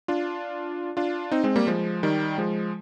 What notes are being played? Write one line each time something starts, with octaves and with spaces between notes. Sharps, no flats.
D4 F4
D4 F4
C4 D#4
G#3 C4
G3 A#3
F3 G#3
D#3 G3
F3 G#3